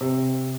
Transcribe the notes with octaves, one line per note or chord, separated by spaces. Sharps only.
C3